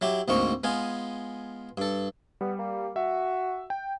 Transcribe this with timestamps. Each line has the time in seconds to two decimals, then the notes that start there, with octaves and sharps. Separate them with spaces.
0.01 F#3 E4 G4
0.28 D2 G#2 A#3 C4 D#4 C#6
0.64 G#3 B3 F4 G#5
1.78 G2 A4
2.41 G3 B3
2.58 A#3
2.96 F#4 E5
3.70 G5